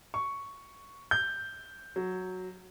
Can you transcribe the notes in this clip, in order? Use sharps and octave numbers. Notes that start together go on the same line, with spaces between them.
C#6
G6
F#3